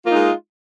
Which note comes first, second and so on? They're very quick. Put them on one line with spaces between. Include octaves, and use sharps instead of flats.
F4 A#3 D#4 G#3